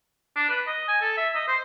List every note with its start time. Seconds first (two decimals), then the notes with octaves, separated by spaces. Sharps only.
0.36 D4
0.49 B4
0.67 D#5
0.88 G#5
1.01 A4
1.17 E5
1.35 D#5
1.48 C5